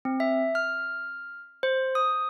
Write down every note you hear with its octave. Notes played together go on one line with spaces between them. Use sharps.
C4
E5
F6
C5
D#6